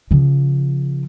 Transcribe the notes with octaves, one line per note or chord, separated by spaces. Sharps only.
C#3 F3